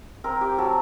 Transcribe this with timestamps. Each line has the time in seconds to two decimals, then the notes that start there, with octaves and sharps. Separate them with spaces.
0.24 C4 A#4
0.41 G4
0.58 F#3 A4